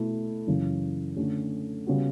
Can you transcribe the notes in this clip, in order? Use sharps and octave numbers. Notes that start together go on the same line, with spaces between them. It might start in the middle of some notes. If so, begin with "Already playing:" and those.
Already playing: B2 A3 E4
F#2 C#3 E3
D3 A3 C#4
C#3 G3 B3 F#4